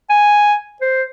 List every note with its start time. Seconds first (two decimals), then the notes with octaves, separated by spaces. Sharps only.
0.09 G#5
0.81 C5